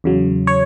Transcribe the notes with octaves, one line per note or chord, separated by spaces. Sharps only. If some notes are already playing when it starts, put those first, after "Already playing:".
E2 C#3 F#3
C#5